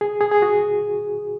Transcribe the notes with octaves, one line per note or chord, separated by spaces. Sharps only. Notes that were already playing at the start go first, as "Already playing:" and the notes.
G#4
G#4
G#4
F#4